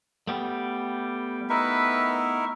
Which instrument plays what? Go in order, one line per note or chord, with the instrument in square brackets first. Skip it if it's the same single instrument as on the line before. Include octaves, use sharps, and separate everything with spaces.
[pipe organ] G3 G5 [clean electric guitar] A3 B3 G4
[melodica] D#4 E4 A#4 [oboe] B4 [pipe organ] E5 C#6